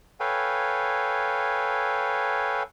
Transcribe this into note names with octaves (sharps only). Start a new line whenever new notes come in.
A4 B4 C#5 F5 G5 G#5